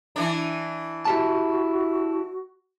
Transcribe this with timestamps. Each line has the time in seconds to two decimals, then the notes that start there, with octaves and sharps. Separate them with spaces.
0.16 E3 D4
1.05 E4 F#4 G4 A5